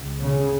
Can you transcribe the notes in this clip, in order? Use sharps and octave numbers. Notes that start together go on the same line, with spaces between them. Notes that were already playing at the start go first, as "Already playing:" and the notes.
Already playing: C#2
C#3